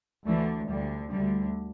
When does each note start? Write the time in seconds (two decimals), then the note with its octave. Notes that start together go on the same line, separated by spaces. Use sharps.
0.27 D2 D3 E3 A3
0.69 D2 D3 G3
1.11 D2 D3 G3